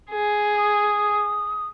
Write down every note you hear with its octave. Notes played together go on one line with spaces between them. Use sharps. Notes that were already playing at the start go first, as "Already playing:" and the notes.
G#4
D#6